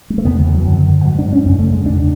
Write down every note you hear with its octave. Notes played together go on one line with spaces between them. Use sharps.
G#3
A3
E2 C#3 B3
D3
E3
F#3
F#2 D3
G#2 F#3
D4
C#4
F#2 C#3 C#4
A3
G#3
E2 C#3 D4